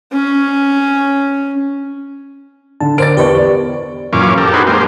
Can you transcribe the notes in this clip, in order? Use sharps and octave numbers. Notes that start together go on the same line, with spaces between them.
C#4
D3 A5
A#4 C5 D5 A6 D7
E2 G4 B4 D5 C#6
F#2 A#2 E3 C#4 F5 D6
G4 A4 A#4
D4 D#4 F#4 G#4 B4 C5
G#3 A#3 G4 C5